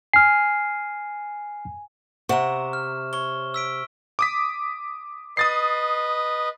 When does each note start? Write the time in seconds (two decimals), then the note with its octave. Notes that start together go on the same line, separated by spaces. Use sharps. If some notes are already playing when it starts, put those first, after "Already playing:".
0.13 G#5 F6 C7
2.29 C3 F#5 A#5 C#6 E7
2.73 F6
3.13 C#5 C#6 G7
3.54 E6 B6 D7
4.19 D6 D#6 B6
5.37 B4 D#5 D#6 A6 C7